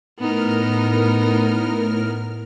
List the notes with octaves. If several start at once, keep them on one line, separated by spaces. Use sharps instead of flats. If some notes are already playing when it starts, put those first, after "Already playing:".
A2 B3 D#4 A#4 F6